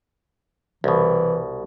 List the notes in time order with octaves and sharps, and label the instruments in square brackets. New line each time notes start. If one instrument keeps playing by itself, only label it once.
[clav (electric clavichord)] C2 B2 [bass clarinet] E3